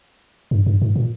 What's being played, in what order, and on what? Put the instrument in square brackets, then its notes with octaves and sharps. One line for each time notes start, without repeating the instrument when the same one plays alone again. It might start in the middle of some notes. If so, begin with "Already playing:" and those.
[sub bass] G2
G2
G#2
A#2